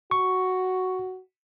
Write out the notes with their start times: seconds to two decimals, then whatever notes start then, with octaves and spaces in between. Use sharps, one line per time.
0.11 F#4 C#6